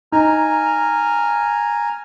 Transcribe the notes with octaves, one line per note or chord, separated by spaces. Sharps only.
D#4 G#5 A#5 F6